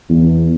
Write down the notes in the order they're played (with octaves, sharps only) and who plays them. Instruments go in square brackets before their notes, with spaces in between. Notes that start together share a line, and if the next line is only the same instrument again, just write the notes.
[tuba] E2